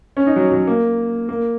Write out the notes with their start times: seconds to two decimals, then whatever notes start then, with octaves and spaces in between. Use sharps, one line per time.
0.17 C#4
0.27 D#4
0.36 F#3
0.52 F#3
0.67 A#3
1.29 A#3